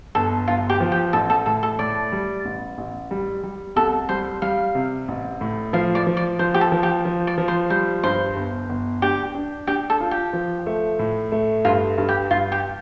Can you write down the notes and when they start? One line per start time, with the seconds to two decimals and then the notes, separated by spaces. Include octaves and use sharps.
0.15 G1 A4
0.48 G1 F4
0.70 G4
0.80 F3
0.92 G4
1.13 A1 A4
1.30 A4
1.46 A2 A4
1.63 A4
1.79 A2 D5
2.12 G3
2.45 A1
2.78 A1
3.11 G3
3.43 G3
3.76 C2 A4
4.09 G3 C5
4.42 G3 F5
4.75 C3
5.08 A1
5.41 A2
5.73 F3 F5
5.95 D5
6.07 F3
6.17 D5
6.39 F3 C5
6.54 G4
6.61 A4
6.72 F3
6.83 G4
7.05 F3
7.27 D5
7.38 F3
7.48 C5
7.70 G3 C5
8.03 G2 C5
8.36 G1
8.69 G1
9.02 D4 G4
9.35 D4
9.67 D4 G4
9.90 A4
10.00 F4
10.11 G4
10.33 F3
10.66 A3
10.99 A2
11.32 A3
11.65 G2 F4
11.98 G2
12.09 G4
12.31 G2 F4
12.52 G4